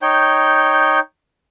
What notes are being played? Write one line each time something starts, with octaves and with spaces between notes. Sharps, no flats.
D#4 C#5 G5 G6